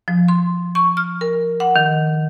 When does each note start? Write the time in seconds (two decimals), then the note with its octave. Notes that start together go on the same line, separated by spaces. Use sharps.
0.08 F3
0.28 C6
0.75 C#6
0.97 F6
1.21 A#4
1.60 F#5
1.76 D#3